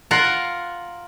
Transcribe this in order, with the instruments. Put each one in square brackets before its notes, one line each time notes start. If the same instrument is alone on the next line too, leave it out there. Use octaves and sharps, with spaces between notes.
[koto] F4 A#4 F#5